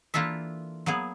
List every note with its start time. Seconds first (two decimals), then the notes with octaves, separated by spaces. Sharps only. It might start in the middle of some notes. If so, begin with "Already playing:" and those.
0.14 E3 A#3 D4 F4 A4 E5
0.86 F#3 A#3 B3 G#4